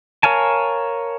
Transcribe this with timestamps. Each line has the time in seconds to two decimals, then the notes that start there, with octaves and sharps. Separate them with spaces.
0.23 A#4 C#5 F5 G#5 A5